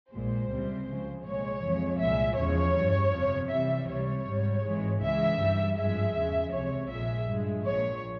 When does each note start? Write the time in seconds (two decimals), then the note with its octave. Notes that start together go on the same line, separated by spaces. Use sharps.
0.11 A#1 A#2 G#3 C5
0.49 C#2 C3 G3
0.87 C#2 C#3 F3 G#3
1.24 C2 A#2 G#3 C#5
1.62 F2 E3 G#3
1.99 C2 A#2 G#3 E5
2.37 E2 C#3 F3 G#3 C#5
2.75 G2 E3 G3
3.13 G1 F2 C3 F3
3.51 F2 C3 E3 G3 E5
3.88 C#2 C3 G3 C#5
4.26 G#1 G#2 G3
4.64 G#1 G#2 E3 G#3
5.01 C#2 C#3 E3 G#3 E5
5.39 G2 E3 G3
5.77 G#1 G2 F3 G#3 E5
6.15 E2 C#3 F3 G#3
6.52 C#2 C3 E3 C#5
6.90 A#1 A#2 F3 G#3 E5
7.28 G2 F3 G#3
7.65 A#1 A#2 F3 C#5